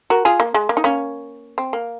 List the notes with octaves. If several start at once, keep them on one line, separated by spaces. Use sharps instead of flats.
F#4 A#4
F4 G#4
A#3
G#3
A#3
D#4
A#3 C#4
C4
A#3